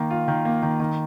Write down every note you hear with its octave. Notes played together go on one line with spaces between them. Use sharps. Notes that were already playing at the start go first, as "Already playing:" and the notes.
Already playing: D#3 A#3
F4
D#3
A#3
D#3
D#3